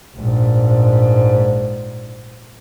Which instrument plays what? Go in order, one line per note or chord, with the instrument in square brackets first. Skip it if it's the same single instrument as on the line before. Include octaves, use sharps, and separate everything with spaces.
[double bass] A#1 G#2